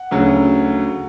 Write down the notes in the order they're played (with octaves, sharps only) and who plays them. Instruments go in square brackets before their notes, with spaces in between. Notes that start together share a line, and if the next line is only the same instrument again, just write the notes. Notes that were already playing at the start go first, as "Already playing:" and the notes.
Already playing: [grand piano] F#5
D2 C#3 F#3